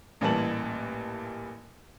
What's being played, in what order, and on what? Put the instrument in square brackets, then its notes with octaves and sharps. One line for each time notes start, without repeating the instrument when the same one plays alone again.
[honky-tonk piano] A1 A#2 E3 G3 A5 F#7